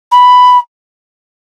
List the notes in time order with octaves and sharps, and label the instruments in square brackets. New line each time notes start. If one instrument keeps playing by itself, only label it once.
[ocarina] B5